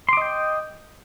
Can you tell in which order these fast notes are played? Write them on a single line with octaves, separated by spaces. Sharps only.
C6 D6 D#5 G5